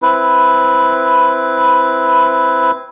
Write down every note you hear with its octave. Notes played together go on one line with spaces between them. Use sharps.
C4 E4 B4